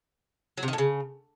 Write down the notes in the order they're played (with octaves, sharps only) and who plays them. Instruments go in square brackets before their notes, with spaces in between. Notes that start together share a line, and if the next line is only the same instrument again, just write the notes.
[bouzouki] F#3
C3
D#3
A2
C#3